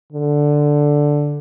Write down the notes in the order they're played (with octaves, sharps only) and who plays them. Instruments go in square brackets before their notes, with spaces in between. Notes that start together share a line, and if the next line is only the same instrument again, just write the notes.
[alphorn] D3